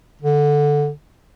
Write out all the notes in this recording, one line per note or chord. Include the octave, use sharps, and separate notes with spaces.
D3